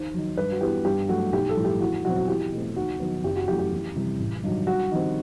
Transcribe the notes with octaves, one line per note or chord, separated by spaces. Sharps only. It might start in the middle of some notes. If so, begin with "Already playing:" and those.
Already playing: D#2 C5
D#3 F#3
G2 B4
F#4
E3 B3 G4
G2 G4
F#3 A3 F#4
B1 G4
A4
A2 G3
G4
E2 F#4
B2 F#3 C4 F#4
F#4
E2 G4
B2 A3 C4
D#2 F#4
D#3 F#3 B3
F#1 G4
F#4
F#2 E3 A3 G4
G4
E2
C3 E3 G3
A1
G2 D#3 F#3
G2 F#4
D#3 G3 C4